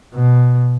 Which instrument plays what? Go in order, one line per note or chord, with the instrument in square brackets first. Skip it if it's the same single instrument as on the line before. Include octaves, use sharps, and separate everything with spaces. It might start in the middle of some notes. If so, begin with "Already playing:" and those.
[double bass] B2